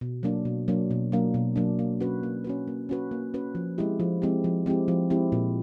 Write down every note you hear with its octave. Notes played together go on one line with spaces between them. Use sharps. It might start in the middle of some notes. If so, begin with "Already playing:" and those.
B2
F#3 A#3 D4
B2
F#3 A#3 D4
B2
F#3 A#3 D4
B2
F#3 A#3 D4
A#3
C#4 F#4 B4
A#3
C#4 F#4 B4
A#3
C#4 F#4 B4
A#3
C#4 F#4 B4
F3
G#3 C4 E4 G4
F3
G#3 C4 E4 G4
F3
G#3 C4 E4 G4
F3
G#3 C4 E4 G4
A#2